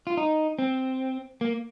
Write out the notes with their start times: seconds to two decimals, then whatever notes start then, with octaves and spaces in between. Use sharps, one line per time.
0.07 F4
0.17 D#4
0.59 C4
1.41 A#3